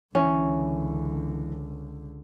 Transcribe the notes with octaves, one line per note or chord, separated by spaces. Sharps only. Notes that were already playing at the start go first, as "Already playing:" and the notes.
C#2 D3 E3 C#4